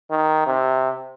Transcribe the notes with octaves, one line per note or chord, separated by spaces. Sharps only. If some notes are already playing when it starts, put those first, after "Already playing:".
D#3
C3